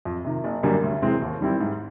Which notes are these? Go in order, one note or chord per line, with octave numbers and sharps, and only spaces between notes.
F2
C3 D#3
F#1
F#2 D3 G3 A#3
D2
C3 E3 G#3 C4
D#2
D#3 G3 C4 E4
G#2